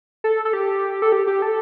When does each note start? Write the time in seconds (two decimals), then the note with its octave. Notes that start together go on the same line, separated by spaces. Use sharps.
0.24 A4
0.45 A4
0.53 G4
1.02 A4
1.12 G4
1.27 G4
1.42 A4